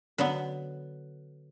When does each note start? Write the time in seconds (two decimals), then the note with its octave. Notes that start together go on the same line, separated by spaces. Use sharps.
0.18 D3 F#3 B3 B4